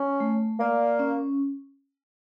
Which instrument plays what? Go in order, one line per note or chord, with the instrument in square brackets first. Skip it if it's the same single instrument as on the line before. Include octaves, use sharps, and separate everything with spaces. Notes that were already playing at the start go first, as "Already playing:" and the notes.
Already playing: [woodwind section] C#4
[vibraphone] A3
[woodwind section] A#3 [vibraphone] D5
[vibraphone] C#4